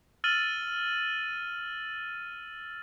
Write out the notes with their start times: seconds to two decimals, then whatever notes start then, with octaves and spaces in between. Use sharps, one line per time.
0.24 E6 F6 A6 D#7 F#7